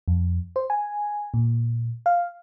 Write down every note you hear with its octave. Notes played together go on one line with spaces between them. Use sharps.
F2
C5
G#5
A#2
F5